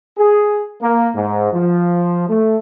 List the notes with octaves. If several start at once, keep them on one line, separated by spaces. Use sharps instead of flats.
G#4
A#3
G#2
F3
A3